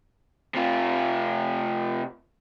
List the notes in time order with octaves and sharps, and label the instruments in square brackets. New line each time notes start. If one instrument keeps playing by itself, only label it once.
[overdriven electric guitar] C3 F4